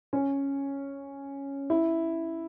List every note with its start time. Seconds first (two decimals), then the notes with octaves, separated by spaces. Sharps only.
0.13 C#4
1.70 E4